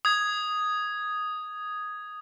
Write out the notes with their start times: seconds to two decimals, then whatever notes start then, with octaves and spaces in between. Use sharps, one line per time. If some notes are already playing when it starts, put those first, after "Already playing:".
0.05 D#6 G#6